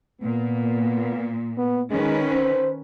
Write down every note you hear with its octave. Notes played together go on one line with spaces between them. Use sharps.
A#2 B3
B3
D#3 G#3 C#4 B4
C5